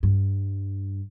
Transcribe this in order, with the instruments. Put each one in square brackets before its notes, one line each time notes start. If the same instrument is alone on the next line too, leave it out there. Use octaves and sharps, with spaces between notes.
[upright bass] G2